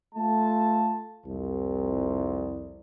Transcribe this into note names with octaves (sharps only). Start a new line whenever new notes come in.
A3 F4 A5
C2 F2